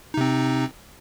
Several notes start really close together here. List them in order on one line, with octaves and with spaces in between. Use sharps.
D#4 C3 C4